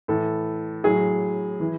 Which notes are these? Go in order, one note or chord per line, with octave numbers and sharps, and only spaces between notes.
A2 E3 A4
A2 F#3 G#4
E3